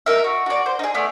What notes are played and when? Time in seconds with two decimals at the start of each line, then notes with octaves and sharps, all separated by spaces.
0.06 D#4 A#4 E5
0.24 F#4
0.46 F#4 D5
0.66 C5
0.79 D#4 G#4
0.94 A3 B3 D5